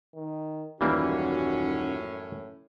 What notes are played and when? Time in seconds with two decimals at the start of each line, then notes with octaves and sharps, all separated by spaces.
0.15 D#3
0.81 D#1 F#2 A2 E3 G3 A#3 C#4 F#4